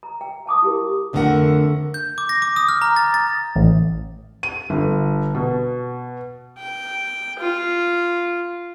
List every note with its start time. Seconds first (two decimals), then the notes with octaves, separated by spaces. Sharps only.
0.03 A#5
0.21 G5
0.46 F5 A5 D6 D#6
0.62 E4 G4 A#4
1.13 F2 D3 A3 B3 A#4 F#5
1.94 G6
2.18 D6
2.29 A#6
2.42 D6
2.56 D#6
2.69 F6
2.82 A#5
2.96 A6
3.14 A6
3.56 A1
4.43 D#7
4.70 G1
5.35 B2
6.58 G5
7.39 F4